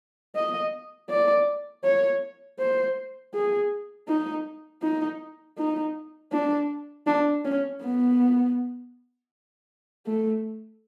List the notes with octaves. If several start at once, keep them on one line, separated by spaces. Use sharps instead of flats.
D#5
D5
C#5
C5
G#4
D#4
D#4
D#4
D4
D4
C#4
B3
A3